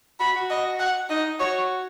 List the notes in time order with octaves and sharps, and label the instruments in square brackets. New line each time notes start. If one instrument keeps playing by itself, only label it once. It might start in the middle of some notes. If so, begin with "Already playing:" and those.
[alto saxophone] F#4 [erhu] B5
[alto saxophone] F#4
[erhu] D#5
F#5
[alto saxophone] D#4 [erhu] D#5
[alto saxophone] F#4 [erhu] C#5